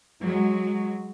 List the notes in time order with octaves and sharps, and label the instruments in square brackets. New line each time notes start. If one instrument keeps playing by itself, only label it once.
[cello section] F#3 G#3